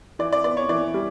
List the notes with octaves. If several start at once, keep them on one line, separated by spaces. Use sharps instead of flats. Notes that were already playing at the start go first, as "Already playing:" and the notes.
E3 D5
D5
B3 D5
C#5
E3 D5
G3